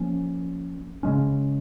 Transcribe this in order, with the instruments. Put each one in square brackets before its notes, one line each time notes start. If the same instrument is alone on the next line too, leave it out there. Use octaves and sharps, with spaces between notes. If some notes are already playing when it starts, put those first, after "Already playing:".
Already playing: [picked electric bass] F3 A#3 C#4
C#3 G#3 C#4